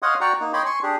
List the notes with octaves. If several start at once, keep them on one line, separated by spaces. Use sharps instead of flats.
C#5 D#5 F5 F#5 C6 D#6
F#4 D5 F#5 G5 A#5 C#6
A#3 D#4
C#5 D#5 G5 B5 C6 D6
G#5 C6 C#6
D4 G4 G#4